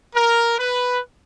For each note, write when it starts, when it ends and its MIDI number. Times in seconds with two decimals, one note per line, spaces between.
0.15 0.57 70
0.59 0.99 71